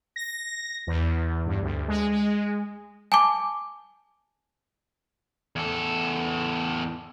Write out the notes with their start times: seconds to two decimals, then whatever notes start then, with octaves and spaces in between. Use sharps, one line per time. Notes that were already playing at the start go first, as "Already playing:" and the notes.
0.16 A#6
0.87 E2
1.46 G2
1.62 D2
1.88 G#3
2.11 G#3
3.12 G#5 A5 D6
5.56 E2 A4